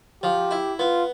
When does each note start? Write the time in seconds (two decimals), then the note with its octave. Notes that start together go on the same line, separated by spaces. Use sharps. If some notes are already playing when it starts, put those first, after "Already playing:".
0.23 F3 G4
0.51 E4
0.79 B3 F4